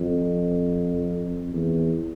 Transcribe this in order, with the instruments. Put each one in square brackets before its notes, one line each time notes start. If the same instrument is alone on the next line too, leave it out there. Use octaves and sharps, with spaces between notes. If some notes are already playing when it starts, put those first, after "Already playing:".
Already playing: [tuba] F2
E2